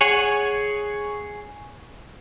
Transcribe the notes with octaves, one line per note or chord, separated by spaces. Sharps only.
G#4 C#5 F#5 G#5